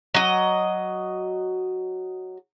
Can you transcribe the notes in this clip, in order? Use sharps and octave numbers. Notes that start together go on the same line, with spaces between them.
F#3 D#5